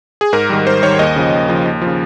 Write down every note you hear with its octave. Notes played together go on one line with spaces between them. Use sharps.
G#4
G#2 A#4
D#3 G3
G#2 C5
D#3 G3 C#5
D#2 D#5
C#3 F3
D#2
C#3 F3
D#2
C#3 F3